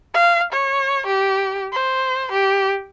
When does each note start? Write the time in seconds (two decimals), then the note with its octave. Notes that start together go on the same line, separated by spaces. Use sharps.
0.14 F5
0.53 C#5
1.07 G4
1.73 C5
2.32 G4